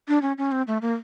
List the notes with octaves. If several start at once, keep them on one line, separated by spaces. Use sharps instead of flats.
D4
C#4
C#4
C4
A3
A#3